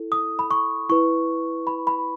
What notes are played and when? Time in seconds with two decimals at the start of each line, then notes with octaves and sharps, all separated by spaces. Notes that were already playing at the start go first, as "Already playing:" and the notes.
Already playing: E4 A4
0.12 D#6
0.39 B5
0.51 C#6
0.89 E4 B4 C#6
1.67 B5
1.87 B5